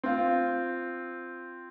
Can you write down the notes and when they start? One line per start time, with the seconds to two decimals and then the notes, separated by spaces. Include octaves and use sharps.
0.04 C4 F4